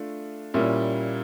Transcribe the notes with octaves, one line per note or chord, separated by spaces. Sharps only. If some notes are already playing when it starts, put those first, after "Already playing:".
Already playing: A3 D4 F4
A#2 G3 A#3 C#4 E4